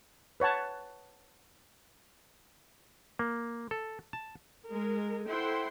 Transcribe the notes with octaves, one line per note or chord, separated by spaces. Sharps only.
B4 C#5 F#5 A5
A#3
A4
A5
G#3 A#4
E4 A4 C5 F#5 G5 C6